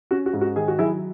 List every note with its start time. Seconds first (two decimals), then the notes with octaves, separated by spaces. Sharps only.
0.11 C#4 F#4
0.26 F#4
0.33 G#2
0.41 F#4
0.56 D#3 G#4
0.68 F#4
0.79 F#3 E4 G#4